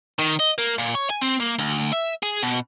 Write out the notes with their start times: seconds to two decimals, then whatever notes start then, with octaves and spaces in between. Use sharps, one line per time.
0.19 D#3
0.40 D#5
0.58 A#3
0.78 A#2
0.95 C#5
1.10 G#5
1.21 C4
1.40 A#3
1.59 D2
1.93 E5
2.23 G#4
2.43 B2